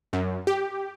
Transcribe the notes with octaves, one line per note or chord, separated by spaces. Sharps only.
F#2
G4